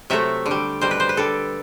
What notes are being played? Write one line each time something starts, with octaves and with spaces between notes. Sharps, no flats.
C3 F#3 A3 E5
D3
G3
B2 G3 C5
B4
C5
B4
D3 G3 A4